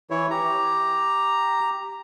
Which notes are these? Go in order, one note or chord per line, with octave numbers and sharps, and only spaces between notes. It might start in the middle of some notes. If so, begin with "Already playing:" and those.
E3 E4 C#5
G4 A#5